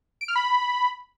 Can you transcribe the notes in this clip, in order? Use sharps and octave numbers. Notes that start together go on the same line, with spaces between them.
D7
F6
B5